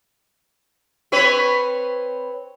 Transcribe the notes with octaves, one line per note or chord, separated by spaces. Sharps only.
C4 B4 C#5